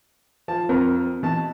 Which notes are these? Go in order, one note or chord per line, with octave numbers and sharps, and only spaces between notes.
F3 A5
F2 C4 A#4
B2 E3 A5